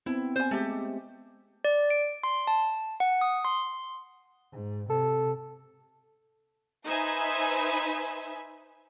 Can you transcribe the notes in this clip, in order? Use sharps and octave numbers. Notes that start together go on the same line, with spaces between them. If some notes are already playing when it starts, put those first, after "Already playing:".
B3 C4 E4
C4 C5 G#5
G#3 A3 G4
D5
D7
C6
A5
F#5
D#6
C6
G#2
C3 A4
D#4 B4 C5 E5 G#5 B5